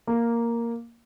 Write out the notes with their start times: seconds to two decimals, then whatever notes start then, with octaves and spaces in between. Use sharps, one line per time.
0.07 A#3